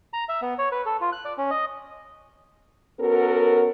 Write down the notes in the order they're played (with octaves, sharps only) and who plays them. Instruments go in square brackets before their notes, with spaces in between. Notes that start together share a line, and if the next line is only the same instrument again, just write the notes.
[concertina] A#5
E5
B3
C#5
B4
A4
F4
F#6
D5
C#4
D#5
[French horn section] B3 C#4 F#4 A4 A#4